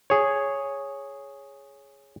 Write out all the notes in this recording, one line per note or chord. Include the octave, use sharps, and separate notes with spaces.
G#4 C#5